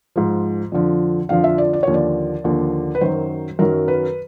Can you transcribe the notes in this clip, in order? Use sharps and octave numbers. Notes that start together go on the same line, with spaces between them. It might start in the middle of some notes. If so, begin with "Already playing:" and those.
G#2 F3
F2 D3 F3
F2 D3 F3 F5
E5
D5
D5
D#2 D3 F3 C#5
D5
D#2 D3 F3
B4
F#2 D#3 F#3 C5
F#2 D#3 F#3 A#4
B4